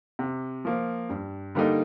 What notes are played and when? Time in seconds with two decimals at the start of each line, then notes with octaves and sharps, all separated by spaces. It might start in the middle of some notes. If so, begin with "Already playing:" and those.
0.19 C3
0.65 F3 A#3
1.09 G2
1.55 D3 G3 A#3 D#4